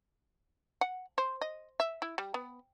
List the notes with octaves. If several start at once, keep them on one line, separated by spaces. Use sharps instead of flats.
F#5
C5
D#5
E5
E4
G3
B3